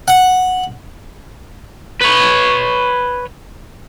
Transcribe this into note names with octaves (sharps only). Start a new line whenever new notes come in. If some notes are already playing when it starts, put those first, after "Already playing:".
F#5
B4 C#5